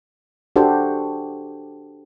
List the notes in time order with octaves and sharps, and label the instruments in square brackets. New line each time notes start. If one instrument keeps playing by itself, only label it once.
[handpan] D4 F#4 G4 A4 C5